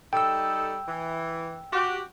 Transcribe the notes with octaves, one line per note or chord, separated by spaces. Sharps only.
G3 D#4 A4 G5 E6
E3
F#4 G4